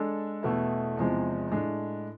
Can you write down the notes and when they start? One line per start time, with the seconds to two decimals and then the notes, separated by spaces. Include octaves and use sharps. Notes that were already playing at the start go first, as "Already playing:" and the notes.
Already playing: G#3 D4 A4
0.43 E2 B2 A3 E4
0.97 E2 C3 F3 G#3
1.51 A2 G#3 D4